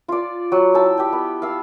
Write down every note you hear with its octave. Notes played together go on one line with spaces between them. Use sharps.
F4 D5
F#3
E4 G5 A5 E6
G4 G5
B3
F5 E6